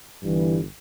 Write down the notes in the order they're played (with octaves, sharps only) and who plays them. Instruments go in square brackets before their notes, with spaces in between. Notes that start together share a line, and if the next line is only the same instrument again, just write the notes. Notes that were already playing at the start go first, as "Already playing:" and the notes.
[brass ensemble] G1 G2 E3